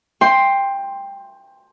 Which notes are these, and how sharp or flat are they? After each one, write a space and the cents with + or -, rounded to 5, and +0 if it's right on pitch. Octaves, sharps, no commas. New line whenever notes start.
G5 +15 C6 +5